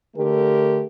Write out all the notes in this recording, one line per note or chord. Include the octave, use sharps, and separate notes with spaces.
D3 A3 G4 A#4